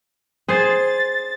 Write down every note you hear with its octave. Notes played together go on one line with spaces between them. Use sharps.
G#4 C5 A6